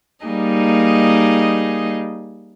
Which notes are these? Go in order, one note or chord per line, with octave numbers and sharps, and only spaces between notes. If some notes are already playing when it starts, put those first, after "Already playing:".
G3 A#3 D#4 G#4 D#5